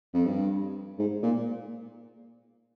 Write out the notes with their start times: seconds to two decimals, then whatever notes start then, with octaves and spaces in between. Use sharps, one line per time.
0.14 F2
0.25 G2
0.99 G#2
1.23 A#2